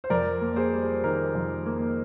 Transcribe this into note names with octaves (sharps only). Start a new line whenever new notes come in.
C5
F2 A#4 D5
A#3
G#4 C5
G3
D#3 A#4
F2
A#3